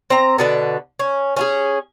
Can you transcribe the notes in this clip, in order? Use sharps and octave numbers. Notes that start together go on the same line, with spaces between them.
C4 A#5
B2 D3 B4
C#4
C#4 F4 G#4